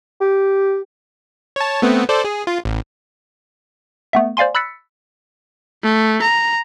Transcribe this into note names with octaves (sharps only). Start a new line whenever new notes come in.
G4
C#5 A5
A3 B3 C4
A4 C5 D5
G#4
F4
A1
A3 B3 E5
C5 D5 F5 G#5 C6
B5 E6 F#6 A6 B6 C#7
A3
A#5